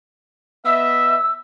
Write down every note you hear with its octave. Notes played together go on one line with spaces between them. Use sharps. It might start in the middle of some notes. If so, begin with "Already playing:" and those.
B3 D#5 E5 E6